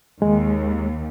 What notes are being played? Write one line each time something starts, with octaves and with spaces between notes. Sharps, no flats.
D#2 G#3